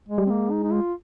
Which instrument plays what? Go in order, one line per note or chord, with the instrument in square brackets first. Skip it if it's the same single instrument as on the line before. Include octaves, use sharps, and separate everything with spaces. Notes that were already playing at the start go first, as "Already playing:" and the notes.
[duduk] G#3
[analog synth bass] G3
[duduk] C4
[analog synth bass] G#3 [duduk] A#3
[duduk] D#4
D#4
F4